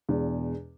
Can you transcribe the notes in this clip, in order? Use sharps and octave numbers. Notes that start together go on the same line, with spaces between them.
E2 B2 G#3 D4